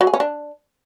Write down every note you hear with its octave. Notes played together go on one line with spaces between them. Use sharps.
F#3
G#4
C#4
D4